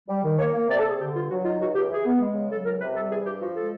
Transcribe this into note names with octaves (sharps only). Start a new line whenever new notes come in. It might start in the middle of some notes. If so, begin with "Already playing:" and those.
G3
D#3
A#3 C#5
A#3
C3 D5
A4
C3
G#4
D3 G4
G2 F4
F#3 F#4
D#4 F4
C#2 F#4
C#2 G4
E3 G#4
B3
G#3
C#3
F#3 A4
C#2 A#4
C3 B4
G3 A4
E3 G#4
G2 G4
F3 F#4
G#3 A4